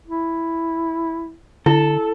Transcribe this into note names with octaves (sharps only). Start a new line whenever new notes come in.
E4
D3 E4 A4